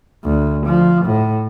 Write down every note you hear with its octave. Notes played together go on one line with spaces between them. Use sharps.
D2
F3
A2